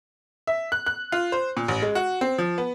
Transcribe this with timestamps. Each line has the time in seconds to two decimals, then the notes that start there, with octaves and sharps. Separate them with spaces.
0.47 E5
0.72 F#6
0.86 F#6
1.12 F4
1.32 C5
1.57 A#2
1.68 A1
1.82 G#3
1.95 F#4
2.21 C4
2.38 F3
2.58 B3